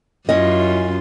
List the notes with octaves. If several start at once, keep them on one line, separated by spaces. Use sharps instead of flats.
F#2 C#4 E4 F4 D#5